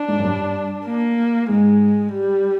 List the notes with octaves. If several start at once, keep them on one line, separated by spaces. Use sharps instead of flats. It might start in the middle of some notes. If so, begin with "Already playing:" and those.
Already playing: D4
G#2
F#2
G2
A#3
G#2 G#3
G3